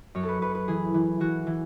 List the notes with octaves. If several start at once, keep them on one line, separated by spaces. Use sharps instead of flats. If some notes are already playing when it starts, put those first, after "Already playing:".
F#2 C#5
A4
B4
F#2 B4
B4
E3 G#4
E3
E3 F#4
E3